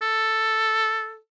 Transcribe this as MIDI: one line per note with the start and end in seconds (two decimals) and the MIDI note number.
0.02 1.17 69